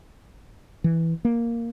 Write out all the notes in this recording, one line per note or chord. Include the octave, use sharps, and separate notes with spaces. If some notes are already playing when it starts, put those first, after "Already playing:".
E3
A#3